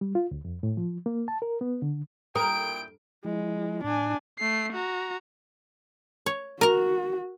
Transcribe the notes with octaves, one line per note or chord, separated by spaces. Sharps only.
G3
F4
D2
F2
A2
F3
A#3
A5
A#4
B3
D3
A#2 E4 A#4 G5 D#6 D7
F3 G#3 E4
A2 D4 G#5
A3 C7
F#4 A#5
C#5
F#4 A#4 A#5